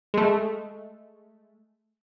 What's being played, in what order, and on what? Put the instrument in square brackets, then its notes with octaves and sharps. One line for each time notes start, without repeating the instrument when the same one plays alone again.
[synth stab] G#3 A3